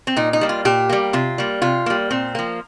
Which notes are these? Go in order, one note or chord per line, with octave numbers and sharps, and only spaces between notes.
C4
A#2 D#4
D#4
G3 A#3
F4
A#2 G4
G3 A#3
C3 F4
G3 A#3
C3 F4
G3 A#3
A#2 C4
F3 A#3